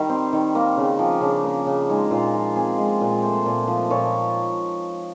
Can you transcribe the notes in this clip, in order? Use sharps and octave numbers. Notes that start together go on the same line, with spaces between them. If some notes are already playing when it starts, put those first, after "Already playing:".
Already playing: D#3 G3
C4
D#3
A#3
C#3
F3
C#3 D4
A#3
C#3
G#3 D#4
A#2 F4
F3
C4 G#4
G#3
A#2
A3 C5
A#2
F3
A#2 C#5